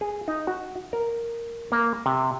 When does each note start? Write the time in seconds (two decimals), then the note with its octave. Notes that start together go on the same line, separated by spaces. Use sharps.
0.01 G#4
0.28 D#4
0.47 F#4
0.93 A#4
1.72 A#3
2.06 C3